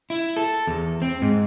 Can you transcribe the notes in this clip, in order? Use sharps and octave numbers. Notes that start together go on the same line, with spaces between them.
E4
A4
E2
C4
G#2